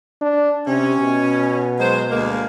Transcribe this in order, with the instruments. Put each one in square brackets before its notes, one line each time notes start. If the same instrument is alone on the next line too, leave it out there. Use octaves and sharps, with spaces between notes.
[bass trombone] D4
[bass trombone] C3 [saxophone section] C#4
[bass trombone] B2
[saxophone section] F#3 G#3 C5
D2 G#3 A#3